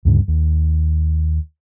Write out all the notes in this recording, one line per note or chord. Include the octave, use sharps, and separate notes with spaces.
D2 G2 C#3
D#2